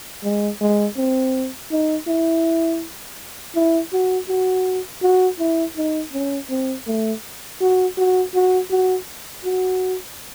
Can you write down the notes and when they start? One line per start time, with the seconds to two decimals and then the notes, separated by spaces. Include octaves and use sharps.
0.24 G#3
0.61 G#3
0.97 C4
1.71 D#4
2.07 E4
3.55 E4
3.93 F#4
4.28 F#4
5.03 F#4
5.39 E4
5.77 D#4
6.13 C#4
6.50 C4
6.87 A3
7.61 F#4
7.98 F#4
8.34 F#4
8.71 F#4
9.44 F#4